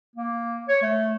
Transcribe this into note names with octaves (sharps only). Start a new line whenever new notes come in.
A#3
C#5
A3